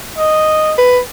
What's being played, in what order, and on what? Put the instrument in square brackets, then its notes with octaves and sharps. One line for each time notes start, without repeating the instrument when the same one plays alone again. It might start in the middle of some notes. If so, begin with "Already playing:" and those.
[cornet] D#5
[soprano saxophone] B4